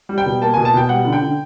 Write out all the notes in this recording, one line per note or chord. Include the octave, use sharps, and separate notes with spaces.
G3
G5
B2
A#3 A5
B2 G#5
A5
B2 G5
G3 F#5
D3
G5
D3